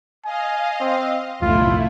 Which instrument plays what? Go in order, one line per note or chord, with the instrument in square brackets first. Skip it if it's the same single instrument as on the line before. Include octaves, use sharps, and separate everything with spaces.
[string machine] D#5 F5 [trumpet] G#5
[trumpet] C4
[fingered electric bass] G1 C2 F2 [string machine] A3 E4 [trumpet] F4